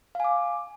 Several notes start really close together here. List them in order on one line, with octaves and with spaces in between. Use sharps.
F5 G#5 D6